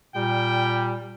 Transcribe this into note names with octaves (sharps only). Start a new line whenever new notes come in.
A#2 G3 G5